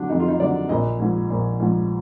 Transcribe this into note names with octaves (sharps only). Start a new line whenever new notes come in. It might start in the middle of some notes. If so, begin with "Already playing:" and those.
Already playing: D3 F#3 D4
F2 D#4
F4
D#4
D3 F#3 D5
A#1 D#5
G#2 F3
A#1
G#2 F3